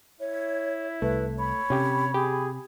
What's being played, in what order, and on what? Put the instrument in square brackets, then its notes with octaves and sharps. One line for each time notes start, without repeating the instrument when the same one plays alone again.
[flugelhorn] E4 [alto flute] C#5
[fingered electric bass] C2 [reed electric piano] A3 [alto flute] B4
[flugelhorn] C#5 [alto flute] B5
[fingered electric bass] C3 [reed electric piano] C#4 G4
[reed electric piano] G4 [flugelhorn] G#4